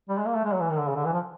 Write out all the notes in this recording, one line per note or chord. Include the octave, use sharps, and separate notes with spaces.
G3
G#3
A#3
A3
G#3
F#3
E3
D#3
D3
C#3
D3
E3
F3